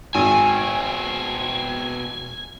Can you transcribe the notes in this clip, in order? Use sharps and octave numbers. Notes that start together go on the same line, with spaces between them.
G#1 B2 C4 G#5